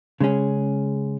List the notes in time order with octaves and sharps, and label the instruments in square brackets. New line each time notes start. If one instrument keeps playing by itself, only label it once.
[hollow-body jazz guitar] C#3 G#3 C#4 G#4